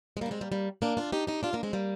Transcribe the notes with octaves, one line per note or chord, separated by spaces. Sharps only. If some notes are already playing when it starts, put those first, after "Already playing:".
G#3
G3 A#3 D4
G#3 C4
G3 A#3
G3 A#3
A#3 D4
D4 F4
D#4 G4
D#4 G4
D4 F4
A#3 D4
G#3 C4
G3 A#3